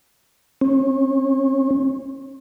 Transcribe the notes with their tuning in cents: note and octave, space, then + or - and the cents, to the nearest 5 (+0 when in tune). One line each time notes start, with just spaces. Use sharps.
C#4 -40